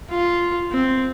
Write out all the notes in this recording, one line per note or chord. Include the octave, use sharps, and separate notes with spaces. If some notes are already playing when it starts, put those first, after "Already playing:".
F4
C4